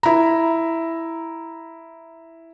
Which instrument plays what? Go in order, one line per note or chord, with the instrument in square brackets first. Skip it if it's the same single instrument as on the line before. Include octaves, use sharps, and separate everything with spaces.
[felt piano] E4 A#5